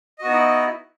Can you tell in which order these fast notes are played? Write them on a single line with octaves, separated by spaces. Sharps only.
D#5 F#4 B3 D#4 E4